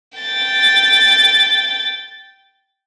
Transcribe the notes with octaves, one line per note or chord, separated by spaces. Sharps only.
G5 A6